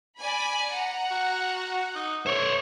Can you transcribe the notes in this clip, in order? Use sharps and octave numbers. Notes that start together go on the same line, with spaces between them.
D5 G#5 B5
F#5 A#5
F#4
D#4
A3 C5 C#5